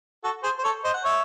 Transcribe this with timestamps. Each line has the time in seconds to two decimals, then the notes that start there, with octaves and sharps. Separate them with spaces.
0.24 F#4 A4
0.43 G#4 C5
0.59 C5
0.64 A4 C#5
0.84 C5 D#5
0.94 F#5
1.04 C#5 E5